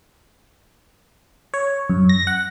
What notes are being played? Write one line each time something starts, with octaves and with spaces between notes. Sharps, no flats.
C#5
F#2
A#6
F#5